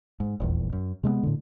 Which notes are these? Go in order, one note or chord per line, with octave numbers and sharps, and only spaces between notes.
G#2
D#1 A#1 E2
F#2
C3 G#3 A3 B3
A2 D3